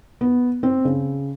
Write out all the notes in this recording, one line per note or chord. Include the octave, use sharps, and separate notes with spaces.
B3
C4
C#3